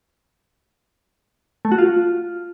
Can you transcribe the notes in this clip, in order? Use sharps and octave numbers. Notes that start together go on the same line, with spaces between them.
A3
F#4
F4